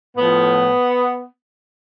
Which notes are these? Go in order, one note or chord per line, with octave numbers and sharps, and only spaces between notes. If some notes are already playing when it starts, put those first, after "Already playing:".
A2 F3 B3